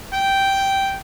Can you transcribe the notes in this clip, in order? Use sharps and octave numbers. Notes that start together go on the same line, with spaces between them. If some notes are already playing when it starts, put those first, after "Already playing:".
G5